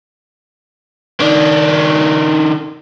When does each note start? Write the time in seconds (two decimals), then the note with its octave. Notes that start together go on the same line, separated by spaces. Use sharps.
1.20 D#3 D4